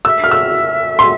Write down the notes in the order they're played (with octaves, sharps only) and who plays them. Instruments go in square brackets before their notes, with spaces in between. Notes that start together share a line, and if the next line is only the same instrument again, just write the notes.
[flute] E5 [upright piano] E6
[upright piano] F6
E6
C6